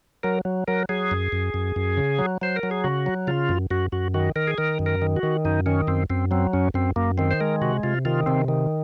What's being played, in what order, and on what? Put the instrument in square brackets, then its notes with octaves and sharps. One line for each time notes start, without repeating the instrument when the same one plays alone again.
[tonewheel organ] F#3 A#4
F#3
F#3 A#4
F#3 G#4
F#2
F#2
F#2
F#2
C#3
F#3
F#3 C5
A#4
F#3
G#4
C#3 F#4
F#3
C#3 F4
F#2
F#2 F#4
F#2 F#4
D#3 F#4
D#3 A#4
G#4
D#3 A#4
F#2
A#4
D#3
F#4
D#3
F#2 D#4
D#3 C#4
F#2 C4
F#2 C4
F#3 C4
F#2 C#4
F#2 C4
F#2 A#3
D#3 C4
C5
G#3 A#4
C3 F#4
C3 F4
D#3 F4
C3 C4
D#3